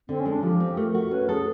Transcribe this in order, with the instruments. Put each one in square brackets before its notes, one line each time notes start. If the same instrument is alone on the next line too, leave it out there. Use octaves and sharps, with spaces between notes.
[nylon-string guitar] D3 [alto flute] C4
[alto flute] C#4
[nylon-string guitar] G#3
[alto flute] D4
[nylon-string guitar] F3 [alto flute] G4
[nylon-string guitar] C4
[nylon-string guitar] A3 [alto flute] A#4
[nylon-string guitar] F#4
[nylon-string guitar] C#4 [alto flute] B4
[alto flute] G#4 [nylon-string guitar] A4